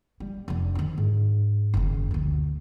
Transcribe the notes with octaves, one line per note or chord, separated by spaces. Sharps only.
G3
F1 D4
D#3 C4
G#2
F#1 D#3
D2 B2